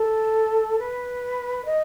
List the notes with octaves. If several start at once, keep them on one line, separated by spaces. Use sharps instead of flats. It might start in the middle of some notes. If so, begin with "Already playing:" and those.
Already playing: A4
B4
D#5